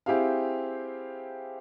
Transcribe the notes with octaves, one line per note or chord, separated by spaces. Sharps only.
C4 E4 G4 G#4 E5 F5